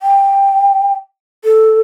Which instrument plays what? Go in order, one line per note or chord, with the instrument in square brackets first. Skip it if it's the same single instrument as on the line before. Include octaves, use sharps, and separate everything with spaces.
[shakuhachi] G5
A4